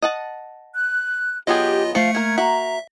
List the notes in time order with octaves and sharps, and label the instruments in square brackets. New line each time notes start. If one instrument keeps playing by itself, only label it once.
[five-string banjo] D#5 F#5 A5
[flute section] F#6
[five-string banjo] F#3 B3 G#4 [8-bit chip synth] F4 D#5 [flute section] G4
[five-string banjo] F3 [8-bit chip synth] A3 C#7 [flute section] F5
[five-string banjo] A#3 A#4 [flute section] G#6
[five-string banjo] A#3 F#4 [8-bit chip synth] E5 [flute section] A#5